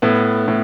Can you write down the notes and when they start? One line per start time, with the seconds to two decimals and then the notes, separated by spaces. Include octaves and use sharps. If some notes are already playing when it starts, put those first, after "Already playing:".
0.02 A2 B3
0.48 A2